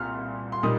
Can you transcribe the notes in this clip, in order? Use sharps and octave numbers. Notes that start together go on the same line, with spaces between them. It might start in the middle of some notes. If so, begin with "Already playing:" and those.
Already playing: C2 A#2 A#5 F6
C6
A#2 G3 A#3 D#4 D#6